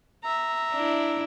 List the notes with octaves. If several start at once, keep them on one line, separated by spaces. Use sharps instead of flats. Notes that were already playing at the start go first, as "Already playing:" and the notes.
E5 A#5
D4 E4